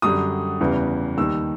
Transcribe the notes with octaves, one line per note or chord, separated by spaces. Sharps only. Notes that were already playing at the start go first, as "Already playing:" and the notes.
F#2 D3 G3 D#6
E2 C#3 E3 G3
D#2 D#3 G3 E6